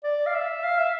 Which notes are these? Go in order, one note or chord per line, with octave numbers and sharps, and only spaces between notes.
D5
F5
E5
F5
E5